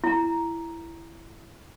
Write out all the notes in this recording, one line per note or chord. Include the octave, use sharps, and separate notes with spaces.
E4 A#5